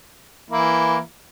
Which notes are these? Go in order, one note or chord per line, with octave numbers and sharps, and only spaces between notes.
E3 A#3 E4